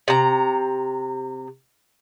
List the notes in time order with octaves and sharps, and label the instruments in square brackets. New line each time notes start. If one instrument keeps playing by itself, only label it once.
[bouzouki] C3 A#5